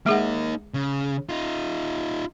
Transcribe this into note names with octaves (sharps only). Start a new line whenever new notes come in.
G#3 A#3 D#4 G#4 F#5
C#3
D#4 F4